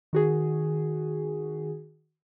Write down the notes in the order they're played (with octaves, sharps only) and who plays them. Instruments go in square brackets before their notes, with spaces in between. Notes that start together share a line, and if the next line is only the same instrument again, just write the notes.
[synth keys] D#3 F#4 G#4